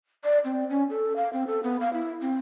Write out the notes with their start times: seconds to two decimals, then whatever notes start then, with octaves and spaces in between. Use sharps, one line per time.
0.24 D5
0.45 C4
0.69 C#4
0.90 A4
1.16 F5
1.33 C4
1.47 A4
1.63 B3
1.80 F5
1.93 E4
2.21 C4